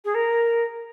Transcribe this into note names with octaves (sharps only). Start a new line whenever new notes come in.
G#4
A#4